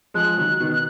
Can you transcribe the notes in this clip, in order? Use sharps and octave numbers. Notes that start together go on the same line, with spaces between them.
F3 G#3 F#6
D#3 F#3
B2 D#3
F#6